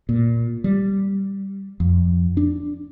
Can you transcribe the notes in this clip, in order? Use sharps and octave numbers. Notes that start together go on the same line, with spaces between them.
A#2
G3
F2
D4